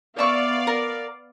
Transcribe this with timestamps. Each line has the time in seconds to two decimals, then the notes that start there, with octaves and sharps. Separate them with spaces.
0.19 B3 D5 E5 F5 C#6
0.67 A#4